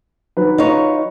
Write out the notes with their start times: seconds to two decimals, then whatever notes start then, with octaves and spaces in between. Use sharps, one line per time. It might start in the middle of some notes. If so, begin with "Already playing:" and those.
0.37 D#3 F#3 B4
0.58 D#4 F4 C#5